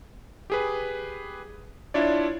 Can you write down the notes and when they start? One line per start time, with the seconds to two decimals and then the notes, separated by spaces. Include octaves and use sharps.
0.50 G4 G#4 B4
1.94 D4 E4 F4 C#5 D5